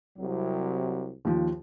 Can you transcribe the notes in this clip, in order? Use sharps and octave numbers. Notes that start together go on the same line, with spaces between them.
C2 F#3
D#2 F3